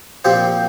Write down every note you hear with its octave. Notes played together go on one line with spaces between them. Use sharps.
A#2 F3 C4 G4 C5